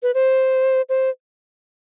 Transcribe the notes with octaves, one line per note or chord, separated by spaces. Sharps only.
B4
C5
C5